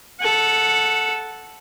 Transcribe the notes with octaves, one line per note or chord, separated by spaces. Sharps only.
A4 F#5